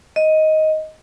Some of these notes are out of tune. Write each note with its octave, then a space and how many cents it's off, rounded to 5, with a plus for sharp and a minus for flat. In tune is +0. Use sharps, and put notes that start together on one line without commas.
D#5 +10